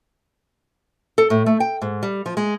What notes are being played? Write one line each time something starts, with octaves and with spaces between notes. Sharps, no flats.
A4
A2
A3
G5
G#2
G3
F3
G#3